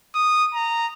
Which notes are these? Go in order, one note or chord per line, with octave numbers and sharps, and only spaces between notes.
D#6
A#5